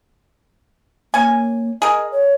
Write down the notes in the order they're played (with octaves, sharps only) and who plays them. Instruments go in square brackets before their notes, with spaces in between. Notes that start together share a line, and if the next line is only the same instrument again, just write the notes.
[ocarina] A#3 [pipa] C#4 G#5
[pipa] G#4 A#4 [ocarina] D#5
[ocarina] C#5